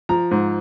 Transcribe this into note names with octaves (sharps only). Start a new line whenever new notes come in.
F3 A#5
G#2